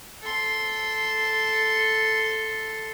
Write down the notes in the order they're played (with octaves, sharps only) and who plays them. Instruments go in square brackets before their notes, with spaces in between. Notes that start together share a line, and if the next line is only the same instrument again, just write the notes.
[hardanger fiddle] A4 C6